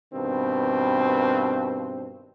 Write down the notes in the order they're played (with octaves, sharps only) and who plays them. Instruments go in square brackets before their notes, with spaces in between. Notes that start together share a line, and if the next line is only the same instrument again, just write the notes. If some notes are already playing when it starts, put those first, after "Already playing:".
[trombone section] G2 B2 D#3 C4